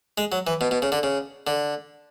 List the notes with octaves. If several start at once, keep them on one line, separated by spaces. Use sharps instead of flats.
G#3
F#3
E3
B2
B2
C#3
D3
C#3
D3